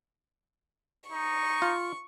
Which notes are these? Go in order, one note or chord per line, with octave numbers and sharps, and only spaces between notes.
D#4 C#6
F4